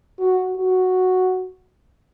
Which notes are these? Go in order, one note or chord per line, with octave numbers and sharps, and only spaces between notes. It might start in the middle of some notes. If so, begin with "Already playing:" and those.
F#4
F#4